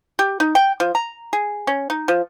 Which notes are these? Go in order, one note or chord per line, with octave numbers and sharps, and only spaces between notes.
G4
D#4
G5
F3
A#5
G#4
C#4
D#4
F3